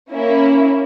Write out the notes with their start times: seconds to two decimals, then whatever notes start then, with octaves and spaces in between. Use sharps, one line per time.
0.10 A#3 C#4 E4